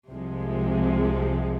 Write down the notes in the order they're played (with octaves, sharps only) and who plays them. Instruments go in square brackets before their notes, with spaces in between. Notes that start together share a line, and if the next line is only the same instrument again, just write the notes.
[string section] C2 C3 F3 G#3